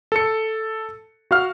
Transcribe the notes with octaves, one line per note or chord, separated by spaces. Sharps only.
A4 C#7
F#4 F5 F6